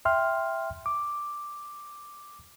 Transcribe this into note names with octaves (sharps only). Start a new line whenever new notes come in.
E5 G5 C6 F6
D6